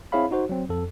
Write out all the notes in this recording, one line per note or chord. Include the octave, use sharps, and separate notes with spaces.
C4 E4 G#4 C#5 F5 B5
D#4 F#4 C5
F#3 C4
F2 A4